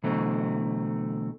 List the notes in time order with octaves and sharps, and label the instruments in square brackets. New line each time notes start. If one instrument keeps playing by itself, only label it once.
[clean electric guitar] B2 D3 E3 F#3 A3 C4